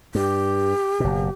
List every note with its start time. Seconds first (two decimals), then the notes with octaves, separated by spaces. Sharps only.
0.15 G2 G4
1.00 F#1 B2